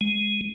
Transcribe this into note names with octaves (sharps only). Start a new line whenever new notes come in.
G#3